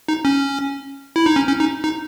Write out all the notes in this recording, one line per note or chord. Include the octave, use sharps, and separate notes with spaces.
D#4
C#4
E4
D#4
C#4
C#4
D#4
D#4